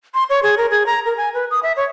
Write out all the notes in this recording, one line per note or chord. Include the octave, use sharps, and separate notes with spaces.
C6
C#5
G#4
A#4
G#4
A#5
A#4
G#5
B4
D#6
E5
C#5